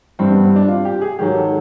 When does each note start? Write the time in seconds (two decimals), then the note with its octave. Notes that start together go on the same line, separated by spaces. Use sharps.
0.19 G2 E3 G3 C4
0.32 B3
0.43 C4
0.56 D4
0.68 F4
0.85 G4
1.02 G#4
1.19 G#2 D#3 F#3 G4
1.35 A4